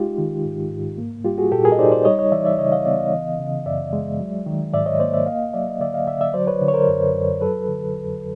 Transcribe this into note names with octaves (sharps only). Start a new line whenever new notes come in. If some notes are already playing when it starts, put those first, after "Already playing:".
Already playing: G#3 D#4 F4 G4
D#3
G#2
G#2
A#3
G3 F4 G4
F#4 G#4
A#2 G4 A4
G#4 A#4
D#5
D#4 C5 D5
C5 D5
G3 C#5 D#5
C#5 D#5
E3 D5 E5
D5 E5
C#3 C#5 D#5
D#5 F5
B3 D5 E5
D#5 F5
E3
C#3
F#2 D5 E5
G#3
F#3
D#3
G#2 D5 E5
C#5 D#5
A#3 C5 D5
D5 E5
A#3 D#5 F5
F#3 D5 E5
D#5
D3 D5 E5
D#5 F5
D3 D5 E5
D5 E5
F#3 C5 D5
B4 C#5
D3
C#5
A#4 C5
F#2
F#2
F#3 A4 B4
D3
F2